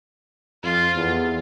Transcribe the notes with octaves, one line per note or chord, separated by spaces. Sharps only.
F2 F4
E2